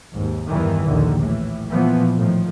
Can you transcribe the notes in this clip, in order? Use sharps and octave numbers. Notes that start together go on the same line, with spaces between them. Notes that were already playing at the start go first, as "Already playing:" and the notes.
D#2 G#2
E2 G2 D#3 E3
A#1 D#2 D3 D#3
A2 E3
A#2 E3 F3 B3
A2 D#3 F3